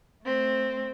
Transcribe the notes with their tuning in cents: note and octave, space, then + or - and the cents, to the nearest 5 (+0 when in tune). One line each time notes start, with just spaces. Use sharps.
A3 +0 C4 +0